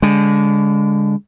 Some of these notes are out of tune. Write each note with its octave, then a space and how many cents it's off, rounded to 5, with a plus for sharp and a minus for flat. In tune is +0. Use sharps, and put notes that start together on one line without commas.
D3 -30 G#3 -30